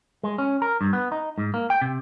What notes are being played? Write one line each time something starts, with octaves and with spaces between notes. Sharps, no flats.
G#3
C#4
A#4
G2
B3
D#4
G#2
A#3
G5
C3